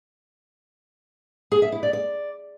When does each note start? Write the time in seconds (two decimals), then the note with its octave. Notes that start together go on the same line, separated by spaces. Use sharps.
1.52 G#4
1.62 E5
1.72 E4
1.83 D5
1.93 D5